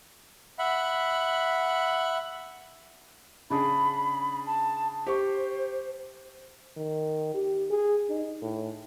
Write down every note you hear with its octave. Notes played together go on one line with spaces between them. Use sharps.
E5 F#5 B5
C#3 D4 G#4 B5
A5
G4 C5 C#6
D#3
G4
G#4
D#4
A2